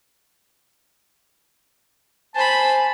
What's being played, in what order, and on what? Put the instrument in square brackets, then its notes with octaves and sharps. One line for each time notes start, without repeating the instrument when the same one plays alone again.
[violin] C5 B5 [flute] G#5 [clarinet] A5